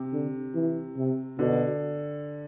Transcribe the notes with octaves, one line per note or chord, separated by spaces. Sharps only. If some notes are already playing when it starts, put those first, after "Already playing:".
Already playing: C3
D3
E3
C3
B2 D3